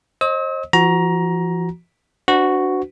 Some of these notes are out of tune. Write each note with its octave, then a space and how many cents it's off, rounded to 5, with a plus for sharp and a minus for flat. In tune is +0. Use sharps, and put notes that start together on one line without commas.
C5 +35 D#5 +0 E6 -45
F3 -40 F#4 +0 A#5 +15
D4 +0 F#4 +0 B4 +45